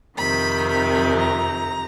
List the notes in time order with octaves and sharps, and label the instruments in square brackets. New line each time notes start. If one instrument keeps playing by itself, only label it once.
[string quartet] F2 C3 D#3 B5
B5
A#5